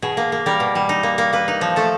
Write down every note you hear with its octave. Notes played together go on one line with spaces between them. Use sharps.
B2 G#4
A#3
A#3
G3 A#4
B2
G3
D#4
A#3
A#3
A#3 B4
D#4
F3
A3 A4